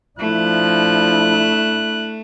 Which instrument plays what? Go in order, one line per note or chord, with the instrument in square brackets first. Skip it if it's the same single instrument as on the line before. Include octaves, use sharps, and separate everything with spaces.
[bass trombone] F3 [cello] A3 [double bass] D4 E4 [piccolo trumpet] F#6